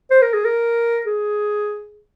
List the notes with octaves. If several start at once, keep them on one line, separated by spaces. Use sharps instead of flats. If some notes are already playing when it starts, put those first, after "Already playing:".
C5
A#4
G#4
A#4
G#4